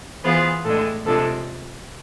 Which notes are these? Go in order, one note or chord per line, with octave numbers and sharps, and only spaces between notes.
E3 B3 F4 G#4 C5
A2 G#3 D4 A4
C3 F3 G#3 D4 A4